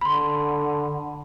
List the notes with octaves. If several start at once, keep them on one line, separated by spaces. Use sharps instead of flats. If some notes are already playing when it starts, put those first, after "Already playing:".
D3 B5 C6